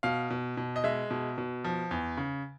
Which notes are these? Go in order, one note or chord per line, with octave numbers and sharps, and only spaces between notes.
B2 F5
B2
B2
D#5
G#3 E5
B2
B2
F3
E2
C#3